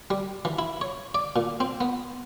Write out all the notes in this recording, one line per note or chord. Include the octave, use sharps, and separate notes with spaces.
G3
E3
E4
C#5
D5
A#2
C4
B3